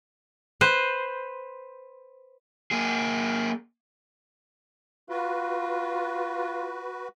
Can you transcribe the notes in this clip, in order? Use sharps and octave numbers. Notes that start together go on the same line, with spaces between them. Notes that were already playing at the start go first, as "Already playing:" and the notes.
B4 C5
A#3 G#4
F4 F#4 B4